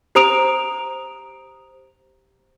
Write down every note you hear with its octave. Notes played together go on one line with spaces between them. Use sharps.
G4 C5 A#5 D#6 D7 F7